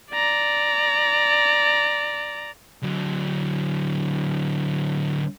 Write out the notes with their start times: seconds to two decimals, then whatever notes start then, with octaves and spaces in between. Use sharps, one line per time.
0.12 D5 A#5
2.83 D3 F#3